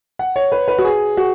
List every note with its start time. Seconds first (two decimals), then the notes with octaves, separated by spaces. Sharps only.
0.19 F#5
0.36 C#5
0.52 B4
0.68 B4
0.78 F#4
0.85 G#4
1.17 F#4